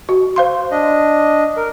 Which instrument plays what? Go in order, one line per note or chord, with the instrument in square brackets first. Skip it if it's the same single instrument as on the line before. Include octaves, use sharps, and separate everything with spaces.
[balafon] F#4
C5 F5 C6
[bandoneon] D4 D#5
A#4